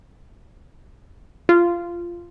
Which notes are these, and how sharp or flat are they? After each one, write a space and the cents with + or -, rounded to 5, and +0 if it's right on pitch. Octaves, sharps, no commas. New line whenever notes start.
F4 -15